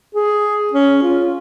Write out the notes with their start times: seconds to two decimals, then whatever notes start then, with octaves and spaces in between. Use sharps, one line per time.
0.15 G#4
0.73 C#4
1.03 F4